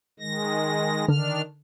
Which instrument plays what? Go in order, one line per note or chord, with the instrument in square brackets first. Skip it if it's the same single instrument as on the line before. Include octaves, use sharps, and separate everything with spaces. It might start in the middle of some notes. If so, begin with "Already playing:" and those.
[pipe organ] D#3 G#3 A#6
[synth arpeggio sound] D3 [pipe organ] D#3 D4 F6